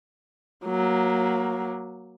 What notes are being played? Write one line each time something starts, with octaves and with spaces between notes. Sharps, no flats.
F#3 A#3